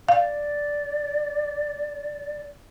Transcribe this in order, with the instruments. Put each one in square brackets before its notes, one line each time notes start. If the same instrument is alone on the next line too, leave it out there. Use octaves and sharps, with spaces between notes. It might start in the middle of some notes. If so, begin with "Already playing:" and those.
[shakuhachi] D5 [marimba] F5